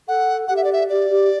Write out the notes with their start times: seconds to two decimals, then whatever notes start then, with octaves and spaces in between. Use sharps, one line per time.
0.08 A4 F#5
0.48 G4 F#5
0.57 E5
0.64 D5
0.73 E5
0.89 G4 D5
1.09 G4